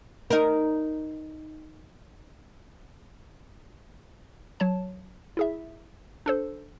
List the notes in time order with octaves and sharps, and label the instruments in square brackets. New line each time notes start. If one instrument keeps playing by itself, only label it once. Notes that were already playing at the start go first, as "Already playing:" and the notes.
[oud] D#4 A#4
[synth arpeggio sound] F#3 C#5 A5
E4 G#4 E5
D4 A4 C5